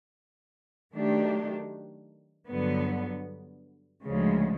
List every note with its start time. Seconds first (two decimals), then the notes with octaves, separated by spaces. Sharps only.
0.94 D#3 F#3 A3 D4 G4
2.48 G2 D3 F#3 B3
4.03 D2 C#3 F3 G#3